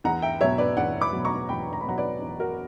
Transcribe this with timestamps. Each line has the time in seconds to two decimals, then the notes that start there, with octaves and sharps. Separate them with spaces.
0.04 E2 F#5 A#5
0.22 E5 G5
0.41 B2 F#3 C#5 E5
0.58 B4 D5
0.77 E2 D5 F#5
1.01 B5 D6
1.13 B2 F#3
1.25 A#5 C#6
1.49 E2 G5 B5
1.73 A#5
1.81 B5
1.85 B2 F#3 F#5 A#5
1.98 B4 D5
2.22 E2
2.40 F#4 A#4